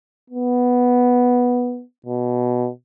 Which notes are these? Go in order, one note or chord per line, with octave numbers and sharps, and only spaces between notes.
B3
B2